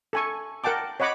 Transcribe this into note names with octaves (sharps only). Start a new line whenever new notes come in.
A4 G#5 C#6
A#4 F#5 G5 A5 D6
C#5 D#5 F#5 B5 D6